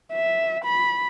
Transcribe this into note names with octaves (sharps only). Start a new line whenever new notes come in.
E5
B5